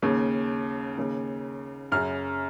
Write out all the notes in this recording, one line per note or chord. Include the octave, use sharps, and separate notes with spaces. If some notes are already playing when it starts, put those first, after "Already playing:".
D#2 C#3
D#2 C#3
F#2 C#3 F6